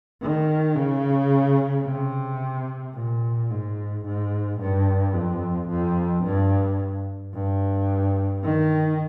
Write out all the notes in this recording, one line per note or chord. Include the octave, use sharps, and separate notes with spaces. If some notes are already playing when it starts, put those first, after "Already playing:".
D#3
C#3
C3
A#2
G#2
G#2
G2
F2
F2
G2
G2
D#3